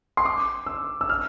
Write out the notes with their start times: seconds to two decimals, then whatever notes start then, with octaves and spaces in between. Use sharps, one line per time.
0.17 C6
0.25 D6
0.66 E6
1.01 E6
1.09 F6